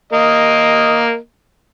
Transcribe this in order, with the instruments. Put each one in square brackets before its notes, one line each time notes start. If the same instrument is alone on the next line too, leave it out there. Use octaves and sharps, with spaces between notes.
[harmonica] A#3 D#5